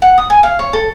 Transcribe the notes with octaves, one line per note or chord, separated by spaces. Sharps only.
F#5
D#6
G#5
F5
C#5
A4